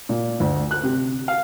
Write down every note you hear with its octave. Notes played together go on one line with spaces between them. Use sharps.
A#2
D2
F#6
C3
F5